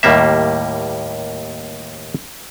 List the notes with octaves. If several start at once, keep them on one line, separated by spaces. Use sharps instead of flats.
D#2 A2 G3 A#3 E5